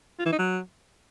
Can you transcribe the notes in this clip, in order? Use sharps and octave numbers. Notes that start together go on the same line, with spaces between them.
F4
E3
D#4
F#3